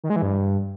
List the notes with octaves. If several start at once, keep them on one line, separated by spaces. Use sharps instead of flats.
D#3
G#3
E3
G2